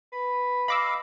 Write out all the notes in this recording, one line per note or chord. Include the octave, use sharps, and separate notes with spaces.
B4
D#5 F5 B5 D6 E6